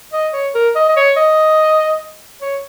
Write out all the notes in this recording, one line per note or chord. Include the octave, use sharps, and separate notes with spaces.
D#5
C#5
A#4
D#5
D#5
C#5
D#5
C#5